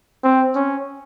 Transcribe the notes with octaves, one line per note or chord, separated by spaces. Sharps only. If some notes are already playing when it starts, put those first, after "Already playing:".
C4
C#4